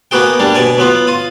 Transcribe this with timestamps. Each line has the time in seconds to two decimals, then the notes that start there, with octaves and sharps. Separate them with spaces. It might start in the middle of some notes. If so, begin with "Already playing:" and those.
0.11 A#3 B3 F#4 G#4 G5
0.39 G3 A#3 D4
0.55 B2 D5 G#5
0.78 F#3 B3 F4
1.07 F4 D#6